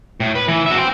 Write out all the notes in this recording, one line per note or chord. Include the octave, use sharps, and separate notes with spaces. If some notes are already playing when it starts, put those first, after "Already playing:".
A2
B4
E3
F#4 E5
G5 C6